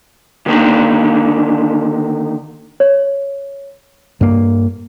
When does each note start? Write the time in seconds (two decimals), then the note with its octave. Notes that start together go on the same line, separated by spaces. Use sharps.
0.46 D3 D#3 G3 A#3 D4 D#4
2.80 C#5
4.21 G2 A#3